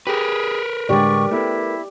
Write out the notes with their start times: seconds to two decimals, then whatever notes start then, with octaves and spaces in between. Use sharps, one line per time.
0.07 G4 G#4 A#4 B4
0.89 A2 D3 G#3 G4 D5 C#6
1.31 A3 B3 E4